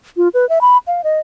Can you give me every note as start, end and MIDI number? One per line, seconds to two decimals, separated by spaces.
0.17 0.28 65
0.34 0.48 71
0.49 0.59 76
0.61 0.78 83
0.87 1.02 77
1.04 1.20 75